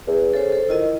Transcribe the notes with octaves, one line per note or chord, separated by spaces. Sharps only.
E2
C#3 A4 C5
A4 C5
D#3 E4 F4 D#5